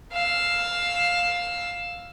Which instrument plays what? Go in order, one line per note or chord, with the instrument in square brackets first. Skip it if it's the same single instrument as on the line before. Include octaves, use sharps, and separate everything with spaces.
[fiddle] F5 E6